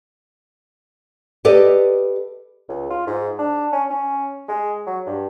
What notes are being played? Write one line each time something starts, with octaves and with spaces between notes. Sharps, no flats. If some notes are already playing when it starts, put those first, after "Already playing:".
G4 A4 B4 D5 D#5
C#2
F4
G#2
D4
C#4
C#4
G#3
F#3
G2